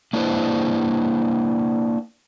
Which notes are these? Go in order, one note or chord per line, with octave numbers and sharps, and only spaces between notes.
A#3 D4 E4 B4 C5